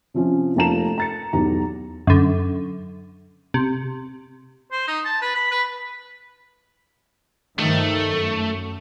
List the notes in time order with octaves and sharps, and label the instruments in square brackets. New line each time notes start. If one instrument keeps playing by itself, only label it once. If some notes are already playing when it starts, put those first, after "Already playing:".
[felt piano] C3 F3 C#4
F1 A#3 F4 A5 A#5 E7
A#5 A6 C#7
B1 E2 G4 A#5
[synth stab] F#2 D3
C3
[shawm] C5
D#4
A5
B4
B5
B4
[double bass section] G2 D#3 F3 [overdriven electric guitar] A3
[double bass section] F#2